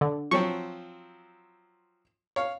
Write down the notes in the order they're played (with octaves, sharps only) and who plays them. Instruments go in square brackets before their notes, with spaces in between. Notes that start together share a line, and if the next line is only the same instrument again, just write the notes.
[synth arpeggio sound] D3
[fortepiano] F3 F#3 C4 [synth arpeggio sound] C#6
[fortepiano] C#5 F5